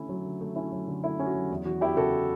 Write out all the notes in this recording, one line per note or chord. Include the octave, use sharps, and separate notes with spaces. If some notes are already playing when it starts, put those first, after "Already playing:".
Already playing: D3 A3 C#4 E4
F#3
D3
A3
C#4 E4
F#3
D3
A3 E4
C#4
F#4
F#3
E2
E3 F#4
E2 E4 G4
C#3 F#4 A4